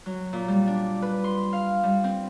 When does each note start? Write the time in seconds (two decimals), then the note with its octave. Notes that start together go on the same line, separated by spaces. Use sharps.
0.06 F#3
0.33 A#2
0.48 G3
0.67 D4
1.02 B4
1.24 C6
1.53 F5
1.83 G3
2.04 C4